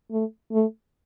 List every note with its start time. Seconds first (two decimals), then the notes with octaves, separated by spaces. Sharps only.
0.12 A3
0.52 A3